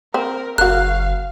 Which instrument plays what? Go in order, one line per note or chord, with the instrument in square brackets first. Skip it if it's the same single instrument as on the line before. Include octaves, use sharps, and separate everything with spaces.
[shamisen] C4 [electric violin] A#4
[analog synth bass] F#1 [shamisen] F#4 A#4 [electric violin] F5 [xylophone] F#6